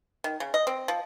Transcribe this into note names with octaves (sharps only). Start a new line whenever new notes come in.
D#3
C#3
D#5
C4
F3